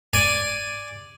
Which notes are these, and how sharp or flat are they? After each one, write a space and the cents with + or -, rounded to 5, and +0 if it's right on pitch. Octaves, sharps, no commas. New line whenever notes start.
D5 +0 G#5 +0